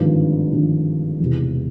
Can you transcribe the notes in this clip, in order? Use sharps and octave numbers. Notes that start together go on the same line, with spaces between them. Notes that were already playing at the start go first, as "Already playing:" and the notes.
Already playing: G#1 G2 D3 F3
G#1 G2 D3 F3
E1 E2 C3